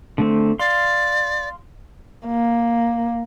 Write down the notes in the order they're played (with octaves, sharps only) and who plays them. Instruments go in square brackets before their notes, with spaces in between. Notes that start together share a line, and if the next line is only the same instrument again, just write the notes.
[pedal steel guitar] D3 A3 C4
[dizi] D5 [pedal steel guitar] F5 C6
[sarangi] A#3